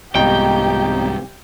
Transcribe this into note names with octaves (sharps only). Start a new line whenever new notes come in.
C2 F2 G#2 B2 D#4 G4 G5